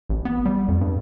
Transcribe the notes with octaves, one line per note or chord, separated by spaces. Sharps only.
A1
B3
G3
F2
G2